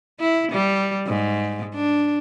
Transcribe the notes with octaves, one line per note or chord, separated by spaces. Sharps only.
E4
G3
G#2
D4